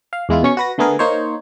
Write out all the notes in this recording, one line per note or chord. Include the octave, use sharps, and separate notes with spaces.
F5
E2 G#3 E4 F4
B2 C#4 C#6
F#4 B4 A#6
D3 A3 B3 G#4 A#4
A#3 D#4 C5 C#5